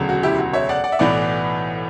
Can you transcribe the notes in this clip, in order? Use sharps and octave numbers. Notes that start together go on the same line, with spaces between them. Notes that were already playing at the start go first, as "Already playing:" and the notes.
Already playing: E1 D2 C#3 F#3
F#4
E4 G4
F#4
C#5 E5
D5 F#5
D5 F#5
E5
B1 A2 E3 B3 D5 F#5